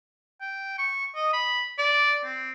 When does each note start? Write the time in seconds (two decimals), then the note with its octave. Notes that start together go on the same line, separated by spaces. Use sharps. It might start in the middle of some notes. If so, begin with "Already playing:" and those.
0.41 G5
0.78 C#6
1.15 D#5
1.33 B5
1.78 D5
2.24 C4